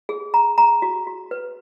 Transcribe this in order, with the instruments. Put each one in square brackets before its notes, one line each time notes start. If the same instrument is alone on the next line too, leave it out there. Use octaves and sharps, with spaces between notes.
[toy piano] G#4
A#5
A#5
F#4
F#4
B4